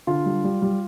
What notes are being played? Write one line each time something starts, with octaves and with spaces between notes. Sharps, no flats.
D3 F4
G3
G3
G3